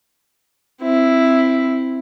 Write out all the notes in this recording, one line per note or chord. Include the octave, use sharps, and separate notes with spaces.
C4 E4